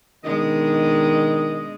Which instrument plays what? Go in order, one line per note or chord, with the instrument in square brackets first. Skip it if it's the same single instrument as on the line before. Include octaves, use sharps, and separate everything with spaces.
[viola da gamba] B2 G#3 D4 [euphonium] D#3 [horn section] D#5